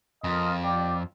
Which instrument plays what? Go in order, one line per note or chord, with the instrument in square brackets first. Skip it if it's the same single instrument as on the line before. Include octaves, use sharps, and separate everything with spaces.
[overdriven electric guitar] F2 [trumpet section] F4 A#4 D#5
[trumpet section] G4 D5